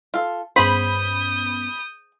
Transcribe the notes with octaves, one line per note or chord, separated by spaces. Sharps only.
F4 A4
G2 B3 C#4 G#4 C5 B5 D#6 G6